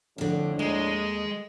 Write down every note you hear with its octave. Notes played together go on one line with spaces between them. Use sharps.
F2 A2 D3 F3 D4
D#2 G#3 D#5